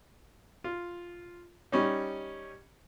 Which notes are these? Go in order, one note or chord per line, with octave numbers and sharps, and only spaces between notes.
F4
G3 C#4 D#4